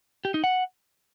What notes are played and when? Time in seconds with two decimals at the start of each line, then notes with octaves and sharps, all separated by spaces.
0.25 G4
0.34 D#4
0.44 F#5